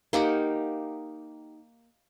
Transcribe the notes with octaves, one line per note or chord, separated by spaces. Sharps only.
A#3 D#4 G4 F#5